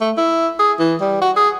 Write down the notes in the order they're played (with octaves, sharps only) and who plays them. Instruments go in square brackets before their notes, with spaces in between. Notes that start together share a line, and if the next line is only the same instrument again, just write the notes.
[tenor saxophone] A3
E4
G#4
E3
G3
F#4
G#4